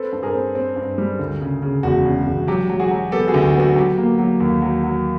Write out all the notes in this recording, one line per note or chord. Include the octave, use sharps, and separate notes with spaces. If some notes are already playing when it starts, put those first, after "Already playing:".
Already playing: C4 A4 B4
G2
G#4 A#4
C4
C4
G2
G3
D2
C#3
C#3
E1 F#4
C#3
E1
F#3 G4
F#3
F#4 G#4
F#3
B3 G4 A4
F#4 G#4
D2
B3 F#4
F#3 G4
A#3
F#3
D#2
F#3
F#3